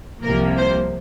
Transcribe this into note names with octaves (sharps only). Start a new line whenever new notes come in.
C2 C3 F3 A#3 A#4
C5